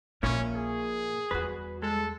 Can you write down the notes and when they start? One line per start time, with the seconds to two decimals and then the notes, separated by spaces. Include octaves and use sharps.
0.23 A#1 A#2 A#3 C#4 E4 C#5
0.55 G#4
1.31 E2 G3 F#4 B4
1.82 G#3 A4